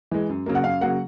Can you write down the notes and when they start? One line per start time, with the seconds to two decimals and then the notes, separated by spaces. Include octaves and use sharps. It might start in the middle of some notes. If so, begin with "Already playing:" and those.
0.11 E3 G#3
0.29 F#2
0.46 C#3 F#3 A#3
0.55 F#5
0.64 F#2 F5
0.81 C#3 F#3 A#3 F#5